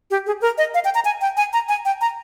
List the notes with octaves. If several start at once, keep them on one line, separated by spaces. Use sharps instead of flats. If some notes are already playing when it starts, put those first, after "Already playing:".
G4
G#4
A#4
D#5
F5
G5
A#5
G#5
G5
G#5
A#5
G#5
G5
A#5